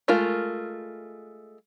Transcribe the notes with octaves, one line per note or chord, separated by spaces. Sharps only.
G#3 A3 F4 A#4